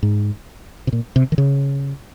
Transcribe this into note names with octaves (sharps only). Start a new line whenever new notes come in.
G#2
C3
A#2
C3
D#3
C#3